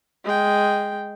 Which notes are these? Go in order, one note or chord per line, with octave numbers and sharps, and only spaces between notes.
G#3 G5